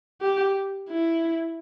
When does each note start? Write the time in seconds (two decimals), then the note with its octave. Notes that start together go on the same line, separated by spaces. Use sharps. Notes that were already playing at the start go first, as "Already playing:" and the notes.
0.22 G4
0.89 E4